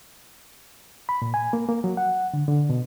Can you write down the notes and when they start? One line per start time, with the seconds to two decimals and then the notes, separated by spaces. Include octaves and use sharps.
1.09 B5
1.22 A#2
1.34 G#5
1.53 A#3
1.69 A#3
1.84 F#3
1.97 F#5
2.34 D3
2.48 D3
2.70 B2